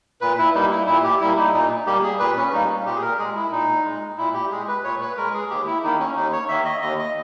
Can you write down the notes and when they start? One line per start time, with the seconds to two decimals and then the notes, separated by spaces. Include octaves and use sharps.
0.21 A#2 B4
0.38 E4
0.55 G3 A#3 D#4
0.71 E4
0.87 A#2 E4
1.04 G4
1.21 G3 A#3 E4
1.38 D#4
1.53 A#2 D#4
1.86 G3 A#3 G4
2.03 G#4
2.19 A#2 B4
2.36 C#4
2.53 G3 A#3 D#4
2.86 A#2 G4
2.96 G#4
3.02 A#4
3.19 G#3 G#4
3.36 E4
3.52 A#2 D#4
3.85 G#3
4.18 A#2 E4
4.34 G4
4.51 G#3 G#4
4.68 B4
4.84 A#2 C#5
5.01 B4
5.17 G#3 A#4
5.34 G#4
5.50 D#2 G4
5.67 E4
5.83 D#3 A#3 D#4
5.99 C#4
6.16 D#2 D#4
6.33 C#5
6.49 D#3 A#3 E5
6.65 D#5
6.82 D#2 D#5
6.99 D#5